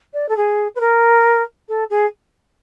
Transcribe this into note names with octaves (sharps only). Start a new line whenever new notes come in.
D5
A4
G#4
B4
A#4
A4
G#4